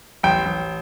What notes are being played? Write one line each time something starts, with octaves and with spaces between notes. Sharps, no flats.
A1 G5
A1